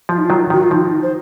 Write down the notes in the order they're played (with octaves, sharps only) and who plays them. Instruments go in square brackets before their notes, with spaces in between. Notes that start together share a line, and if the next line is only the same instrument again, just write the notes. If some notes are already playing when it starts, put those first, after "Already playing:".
[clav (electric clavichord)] F3 [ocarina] F4
[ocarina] D#4
[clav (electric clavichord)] D#3 F#3 [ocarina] F4
[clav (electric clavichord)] D#3 [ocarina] F#4
[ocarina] F4
[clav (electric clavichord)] F3 [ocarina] D#4
[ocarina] C5